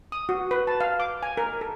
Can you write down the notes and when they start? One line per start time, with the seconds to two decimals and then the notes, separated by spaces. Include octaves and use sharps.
0.12 D#6
0.29 F#4
0.51 B4
0.67 A5
0.81 F5
1.00 D6
1.23 G#5
1.37 A#4
1.61 A4